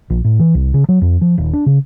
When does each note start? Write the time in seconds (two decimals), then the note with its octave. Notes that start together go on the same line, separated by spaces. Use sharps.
0.10 A#1
0.25 A2
0.40 E3
0.54 C2
0.74 C#3
0.89 F#3
1.01 F2
1.21 F3
1.38 D#1
1.53 D4
1.66 C#3